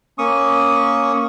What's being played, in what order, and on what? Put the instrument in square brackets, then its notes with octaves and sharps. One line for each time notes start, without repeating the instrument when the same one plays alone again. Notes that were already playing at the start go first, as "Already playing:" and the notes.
[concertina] A#3 C#4 C#6 D#6